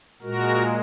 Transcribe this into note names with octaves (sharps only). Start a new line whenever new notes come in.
A#2 G#3 F#4 A#4